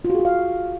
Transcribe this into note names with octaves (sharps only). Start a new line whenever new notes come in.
F4
F#4
G#4
F#4
F5